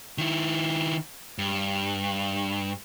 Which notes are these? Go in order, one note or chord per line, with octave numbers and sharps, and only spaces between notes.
D#3 E4
G2